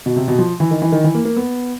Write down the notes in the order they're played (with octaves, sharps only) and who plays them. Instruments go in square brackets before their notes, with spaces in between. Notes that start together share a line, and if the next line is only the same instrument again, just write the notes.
[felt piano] B2
C3
B2
F3
E3
D#3
E3
D#3
E3
A#3
A#3
B3